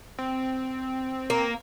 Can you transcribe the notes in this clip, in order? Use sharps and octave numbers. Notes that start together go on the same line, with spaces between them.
C4
A#3